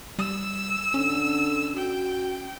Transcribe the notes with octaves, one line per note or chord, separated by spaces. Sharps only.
G3 E6
D3 C#4
F#4 G5